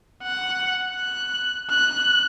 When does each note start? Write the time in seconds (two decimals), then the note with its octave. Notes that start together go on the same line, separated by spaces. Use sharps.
0.23 F#5
0.97 F#6
1.70 F#6